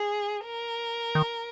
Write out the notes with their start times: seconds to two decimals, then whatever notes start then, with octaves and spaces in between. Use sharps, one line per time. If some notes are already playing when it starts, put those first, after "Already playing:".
Already playing: G#4
0.43 A#4
1.15 D#3